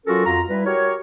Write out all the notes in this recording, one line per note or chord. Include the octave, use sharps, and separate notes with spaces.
F#3 C#4 F4 F#4 A4 A#4
F2 F4 F#4 A#5
G3 E4 B4
F#4 G4 A#4 C#5